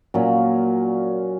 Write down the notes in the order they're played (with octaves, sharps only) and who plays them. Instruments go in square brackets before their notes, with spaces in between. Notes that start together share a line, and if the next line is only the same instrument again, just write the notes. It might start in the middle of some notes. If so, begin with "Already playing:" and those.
[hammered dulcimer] A#2 F#3 C#4